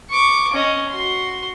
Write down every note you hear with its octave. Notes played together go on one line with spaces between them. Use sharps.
C#6 D6
C#4 D#5
F#4 C6